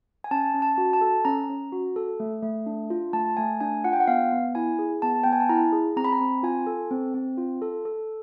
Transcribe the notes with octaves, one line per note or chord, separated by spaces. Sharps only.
G#5
C#4 A5
C#4
A5
F#4
A5
A4
C#4 A#5
C#4
F#4
A4
A3
A3
D4
F4
A3 A5
A3 G#5
D4 G#5
F4 F#5
G5
F#5
B3 F5
B3
E4 G#5
G#4
B3 A5
B3 G5
G#5
A5
E4 A#5
G#4
C4 A#5
B5
A#5
C4
F4 G#5
A4
C4
C4
F4
A4
A4